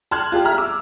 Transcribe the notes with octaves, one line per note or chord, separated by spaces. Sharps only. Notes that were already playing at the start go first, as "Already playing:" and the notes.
A5 C6 F6 F#6 G#6
F4 G4 G#4
E5 A#5 F6
D6 E6